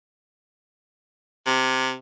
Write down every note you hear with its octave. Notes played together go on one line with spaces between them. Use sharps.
C3